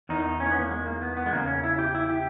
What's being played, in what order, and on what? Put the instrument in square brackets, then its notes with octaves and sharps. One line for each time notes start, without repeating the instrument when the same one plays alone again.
[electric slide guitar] E2 D#3 D#4
D#4
C#4
A#3
B3
A#3
G#3
A#3
B3
B3
G#3
E2 C#3 A#3
C#4
E4
G4
E4
G4